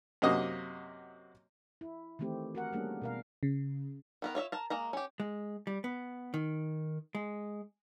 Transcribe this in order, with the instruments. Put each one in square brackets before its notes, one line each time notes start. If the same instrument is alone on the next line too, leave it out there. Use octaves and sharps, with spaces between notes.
[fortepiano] F#2 C3 A#3 F#4 D#5 D#6
[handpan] E4
D#3 E3 A3 C4 G4
F#4 A#4 F#5
G3 A3 A#3 C#4 D4 G#4
B2 A#4 F5
[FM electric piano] C#3
[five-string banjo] D#3 B3 A#4
F4 C#5 D#5 E5
A#4 A5
G#3 A#3 A#5
C#4 G4
[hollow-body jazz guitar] G#3
G3
B3
D#3
G#3